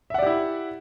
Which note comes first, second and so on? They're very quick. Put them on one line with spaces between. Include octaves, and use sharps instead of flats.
E5 F#5 D5 G4 E4